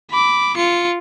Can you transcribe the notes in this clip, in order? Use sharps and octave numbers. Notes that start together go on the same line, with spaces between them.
B5 D6
F4 C#7